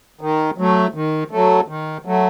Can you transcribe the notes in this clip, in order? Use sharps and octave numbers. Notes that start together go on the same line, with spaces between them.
D#3
F#3 A3
D#3
F#3 A3
D#3
F#3 A3